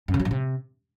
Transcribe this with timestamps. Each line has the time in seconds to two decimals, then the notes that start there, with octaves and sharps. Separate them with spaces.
0.08 F#2
0.14 C#3
0.20 F#3
0.25 A#2
0.31 C3